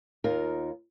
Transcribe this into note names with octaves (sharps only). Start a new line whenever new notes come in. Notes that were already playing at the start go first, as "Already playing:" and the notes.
D#2 D#4 F4 A#4